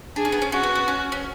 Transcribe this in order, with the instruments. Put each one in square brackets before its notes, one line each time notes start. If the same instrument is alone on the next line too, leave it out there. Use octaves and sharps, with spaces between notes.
[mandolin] D4 [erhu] G#4
[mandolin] C#4
B3
C#4
[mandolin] C#4 [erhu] F#4
[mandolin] B3
B3
C#4
C#4